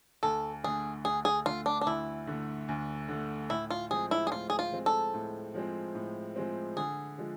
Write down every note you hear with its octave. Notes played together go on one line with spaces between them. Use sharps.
D2 A4
D3 A3 G#4
D2 G#4
G#4
D3 A3 F4
D4
D4
D2 E4
D3 A3
D2
D3 A3
A2 E4
F4
F3 G#3 C4 G#4
E4
G#4
A2 F4
G#4
F4
F3 G#3 C4
A4
A2
F3 G#3 C4
A2
F3 G#3 C4
D3 G#4
F3 G#3